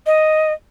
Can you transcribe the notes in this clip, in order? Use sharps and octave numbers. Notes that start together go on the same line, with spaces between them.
D#5